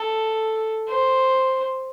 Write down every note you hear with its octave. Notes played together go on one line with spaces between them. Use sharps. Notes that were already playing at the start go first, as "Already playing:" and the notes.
Already playing: A4
C5